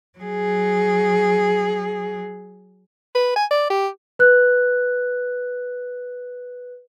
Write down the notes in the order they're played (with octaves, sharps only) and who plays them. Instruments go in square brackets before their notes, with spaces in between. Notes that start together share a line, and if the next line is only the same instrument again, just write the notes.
[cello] F#3 G#4
[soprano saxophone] B4
G#5
D5
G4
[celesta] B4 F#6